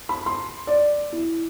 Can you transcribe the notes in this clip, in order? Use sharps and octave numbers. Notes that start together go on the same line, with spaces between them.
B5
C6
D5
E4